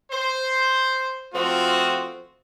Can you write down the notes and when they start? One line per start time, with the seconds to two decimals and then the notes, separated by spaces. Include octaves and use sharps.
0.12 C5
1.34 F3 A3 C4 F4 F#4